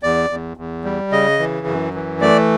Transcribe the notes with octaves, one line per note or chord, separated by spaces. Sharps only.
E2 D5
E2
E2
G3
C#3 D#5
E3
F#2
E3
A3 D5